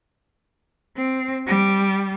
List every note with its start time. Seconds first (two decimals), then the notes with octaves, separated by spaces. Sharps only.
0.97 C4
1.47 G3